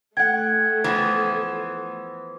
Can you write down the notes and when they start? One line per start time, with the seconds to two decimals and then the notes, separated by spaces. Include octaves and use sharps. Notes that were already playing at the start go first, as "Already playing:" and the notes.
0.17 A3 F#5 G5 G#6
0.84 E3 F3 B3